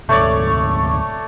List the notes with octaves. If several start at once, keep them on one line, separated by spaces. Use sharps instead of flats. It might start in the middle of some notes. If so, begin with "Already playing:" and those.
D2 G#2 C3 A3 C#5 D5